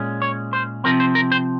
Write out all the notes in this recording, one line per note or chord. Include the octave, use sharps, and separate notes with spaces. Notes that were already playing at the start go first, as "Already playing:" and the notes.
Already playing: A#2 G#3 C#4
C#5
C5
C3 F3 C4 A#4
C5
A#4
C5